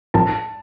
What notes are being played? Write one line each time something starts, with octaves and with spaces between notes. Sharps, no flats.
A2 F3 C4 F4 A#4 A5